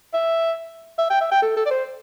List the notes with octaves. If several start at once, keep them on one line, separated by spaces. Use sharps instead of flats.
E5
E5
G5
E5
G5
A4
A4
D5
C5